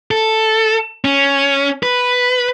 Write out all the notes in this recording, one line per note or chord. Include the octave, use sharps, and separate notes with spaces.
A4
C#4
B4